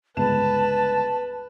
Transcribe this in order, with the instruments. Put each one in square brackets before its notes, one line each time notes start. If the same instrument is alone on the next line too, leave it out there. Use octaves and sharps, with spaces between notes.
[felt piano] G1 C#2 E7 [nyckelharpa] B4 [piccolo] A5